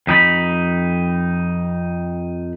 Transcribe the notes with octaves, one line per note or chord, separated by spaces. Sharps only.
F2 D#4 G4 B5